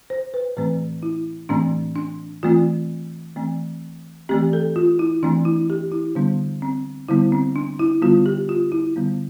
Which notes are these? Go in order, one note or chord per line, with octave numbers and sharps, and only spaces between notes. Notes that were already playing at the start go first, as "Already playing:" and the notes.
C5
B4
A2 E3 A3 C4 B4
E4
A2 E3 A3 C4 D4
D4
E3 A3 C4 F4
E3 A3 C4
E3 A3 C4 G4
A4
F4
E4
E3 A3 C4 D4
E4
G4
E4
D3 G3 B3 D4
C4
D3 G3 B3 E4
C4
D4
E4
D3 G3 B3 F4
G4
F4
E4
D3 G3 B3